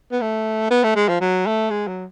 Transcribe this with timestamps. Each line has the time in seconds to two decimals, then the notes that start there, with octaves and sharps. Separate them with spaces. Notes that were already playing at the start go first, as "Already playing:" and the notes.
0.12 B3
0.21 A3
0.71 B3
0.84 A3
0.96 G#3
1.08 F3
1.21 F#3
1.47 A3
1.71 G#3
1.88 F#3